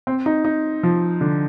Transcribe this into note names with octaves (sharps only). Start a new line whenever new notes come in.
C4
D#4
D#4
F3
D3